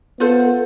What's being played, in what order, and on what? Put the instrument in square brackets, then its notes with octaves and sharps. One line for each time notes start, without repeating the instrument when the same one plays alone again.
[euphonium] B3 [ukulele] F4 A4 C5